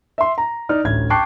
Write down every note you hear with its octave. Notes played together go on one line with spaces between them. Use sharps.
E5 C6
A#5
D#4 D5 F6
A1 D2 G#6
G5 A5 C#6 D6 F#6 C7